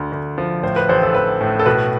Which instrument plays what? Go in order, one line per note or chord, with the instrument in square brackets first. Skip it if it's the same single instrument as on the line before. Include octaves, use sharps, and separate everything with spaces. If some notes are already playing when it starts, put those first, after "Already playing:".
Already playing: [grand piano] D2 D3
D2
F3
A2 C5
B4
A1 C5
A4
A1 B4
A2
A4
B2 B4